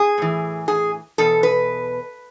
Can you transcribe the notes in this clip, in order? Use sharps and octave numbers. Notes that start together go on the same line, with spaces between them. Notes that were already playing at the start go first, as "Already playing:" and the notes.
Already playing: G#4
A2 E3
G#4
E2 B2 A4
B4